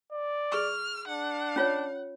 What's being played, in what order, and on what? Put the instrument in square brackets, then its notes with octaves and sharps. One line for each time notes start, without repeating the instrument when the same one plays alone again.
[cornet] D5
[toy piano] G#4 C#6 [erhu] F6
[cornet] D4 [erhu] F#5
[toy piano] C#4 F4 C#5